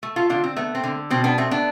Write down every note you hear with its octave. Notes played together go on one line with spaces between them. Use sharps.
A3
F4 A4
D3 D4 F4
C4
A3 B3
C4
D3
B2 C4
B3 D4
A3 C4
B3 D4